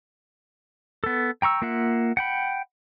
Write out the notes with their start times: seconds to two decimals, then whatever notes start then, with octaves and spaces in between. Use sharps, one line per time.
1.04 B3 A4
1.42 G5 A#5 C#6 E6
1.62 A#3 F4 E5 F#5
2.17 F#5 G5 B5